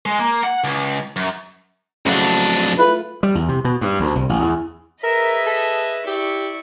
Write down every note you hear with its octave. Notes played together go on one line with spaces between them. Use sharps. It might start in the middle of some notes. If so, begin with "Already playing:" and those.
G#3
A#3
F#5
C#2
F#2
F2 C#3 F#3 A3 D4 F#5
A3 F4 B4
G3
E2
C3
B2
G2
D2
C2
A1
E2
G#4 A#4 B4 D#5 E5
A4
E4 G4 D5 C#6